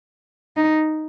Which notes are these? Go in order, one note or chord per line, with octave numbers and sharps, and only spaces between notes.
D#4